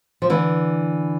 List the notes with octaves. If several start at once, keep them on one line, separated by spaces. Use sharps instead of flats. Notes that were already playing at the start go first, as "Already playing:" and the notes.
F3
D3 E3